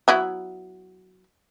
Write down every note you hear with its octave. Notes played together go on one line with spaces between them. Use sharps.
F#3 B3 E4